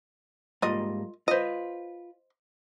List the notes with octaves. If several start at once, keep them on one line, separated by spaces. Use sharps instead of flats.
G#2 G3 A#3 F4 D#5
F4 B4 C5 D#5